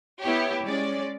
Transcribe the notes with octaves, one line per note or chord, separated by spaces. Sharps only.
B3 E4 G4 C#5
G#3 C#4 D5